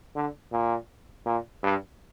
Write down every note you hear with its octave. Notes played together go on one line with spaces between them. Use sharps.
D3
A#2
A#2
G2